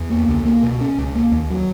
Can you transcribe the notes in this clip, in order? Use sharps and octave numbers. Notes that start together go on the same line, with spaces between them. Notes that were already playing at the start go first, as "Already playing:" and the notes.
Already playing: E2
A#3
C#2
A#3
B2
C#4
C#2
A#3
D#2
F#3